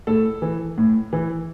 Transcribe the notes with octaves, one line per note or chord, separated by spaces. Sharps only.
A2 A4
E3
A2
E3